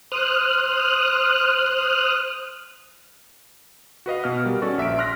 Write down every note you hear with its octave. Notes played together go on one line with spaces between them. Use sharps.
C5 D#6 F6 F#6
F#4 B4 D#5 F5
B2 F6
G3 F#4 A#4
C#4 F#4 A4 B4 D5 C#6
A#1 E5 B6 D7
C6 F6 F#6 A#6